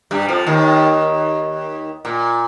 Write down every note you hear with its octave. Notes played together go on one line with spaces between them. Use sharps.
G2 G3
F2 F3
D#2 D#3
A#2